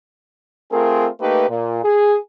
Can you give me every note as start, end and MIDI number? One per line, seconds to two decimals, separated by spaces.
0.72 1.08 57
0.72 1.08 60
0.72 1.08 65
0.72 1.08 68
0.72 1.08 70
1.20 1.47 57
1.20 1.47 58
1.20 1.47 63
1.20 1.47 67
1.20 1.47 71
1.49 1.80 46
1.84 2.16 68